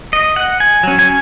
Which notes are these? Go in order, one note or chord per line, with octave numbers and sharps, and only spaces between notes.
D#5
F#5
G#5
F#3 C#4
G#5